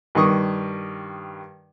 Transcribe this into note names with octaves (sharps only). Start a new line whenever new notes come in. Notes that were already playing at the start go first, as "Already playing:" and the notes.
G2 D#3 C#6 D#6